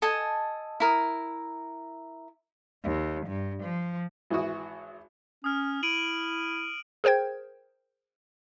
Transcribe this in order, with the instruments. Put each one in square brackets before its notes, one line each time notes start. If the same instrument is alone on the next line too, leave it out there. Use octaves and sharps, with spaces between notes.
[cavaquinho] A4 D#5 G#5 A5
E4 A#4 D#6
[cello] D#2
G2
F3
[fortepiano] G#1 E3 E4 F#4 D#6
[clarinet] C#4 [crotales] D#6 F6
[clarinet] E4 [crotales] D7 D#7 F#7
[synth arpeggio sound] G#4 A#4 C5 G5 G#6